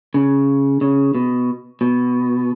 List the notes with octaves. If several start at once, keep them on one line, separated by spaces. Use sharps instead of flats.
C#3
C#3
B2
B2